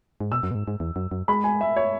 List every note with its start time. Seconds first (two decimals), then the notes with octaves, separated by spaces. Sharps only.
0.20 G#2
0.32 B2 E6
0.43 F#2
0.51 B2
0.55 G#2
0.68 G#2
0.80 E2
0.96 F#2
1.11 F#2
1.28 G#3 B5
1.44 G#5
1.61 E5
1.76 C#5